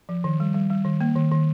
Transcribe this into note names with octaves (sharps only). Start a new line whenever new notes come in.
F3
D#3
G3
G3
G3
D#3
A#3
D#3
D#3